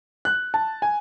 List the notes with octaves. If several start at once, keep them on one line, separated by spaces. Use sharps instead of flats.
F#6
A5
G#5